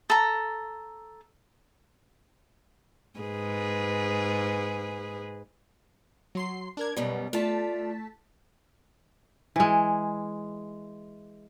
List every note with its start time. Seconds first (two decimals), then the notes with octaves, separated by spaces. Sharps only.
0.10 A4 A#5
3.20 G#2 G#4 B4
6.35 F#3 C6 C7
6.77 D4 A#4 G#6
6.96 F#2 B2 G3 B3
7.33 A3 F4 D5 A5 B6
9.56 E3 G#3